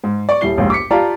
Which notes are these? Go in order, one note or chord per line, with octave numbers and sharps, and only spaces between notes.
G#2
D5 C#6
D#1 G3 E4 C7 G7
A#1 D#2 G#2
D6 B6 C#7
F4 G4 D5 F5 A5 A#5